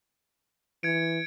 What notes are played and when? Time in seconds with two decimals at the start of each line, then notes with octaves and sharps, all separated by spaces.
0.83 E3 G#6 C#7 D7